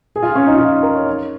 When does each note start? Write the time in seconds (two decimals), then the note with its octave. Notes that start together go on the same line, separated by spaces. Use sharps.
0.16 G#4
0.23 F4
0.35 C#4
0.47 D#4
0.55 F4
0.59 D#4
0.83 A#4
0.95 C#5
1.06 C#5